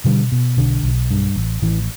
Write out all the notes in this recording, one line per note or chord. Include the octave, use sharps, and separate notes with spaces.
B2 D3 G3
B2
B1 D3
B1
G2
A1
A1 E3